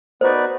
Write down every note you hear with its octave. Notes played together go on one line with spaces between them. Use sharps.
B3 D#4 F#4 B4 C5 D5